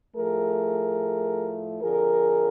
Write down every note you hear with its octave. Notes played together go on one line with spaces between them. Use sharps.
A2 F3 A3 G#4 A#4
F2 D3 F3 G#4 A#4